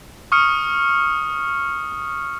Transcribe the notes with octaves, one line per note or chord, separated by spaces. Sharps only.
C#6 D#6 F6 C#7